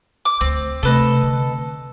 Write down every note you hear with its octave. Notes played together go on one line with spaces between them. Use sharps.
D6
D2 C4
C3 A3 A4 B4 D#5
D3